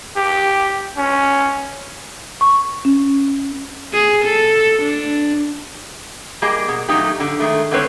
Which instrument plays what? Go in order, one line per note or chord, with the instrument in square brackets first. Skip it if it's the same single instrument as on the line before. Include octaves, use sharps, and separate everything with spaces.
[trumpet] G4
C#4
[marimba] C#6
C#4
[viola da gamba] G#4
A4
D4
[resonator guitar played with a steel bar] G3 A#3 G4 G#4 D#5
B2
A#2 F#3 A3 C#4 D#4 G4
D3
D#3 G#3 A3
G#2 D3 A3 C4 B4 C#5